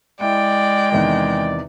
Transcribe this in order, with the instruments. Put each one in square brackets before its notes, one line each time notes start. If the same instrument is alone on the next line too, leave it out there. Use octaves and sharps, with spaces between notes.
[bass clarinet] G#3 [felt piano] E4 [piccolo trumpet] D5 [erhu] G5
[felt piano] E2 C3 D#3 [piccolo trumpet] D5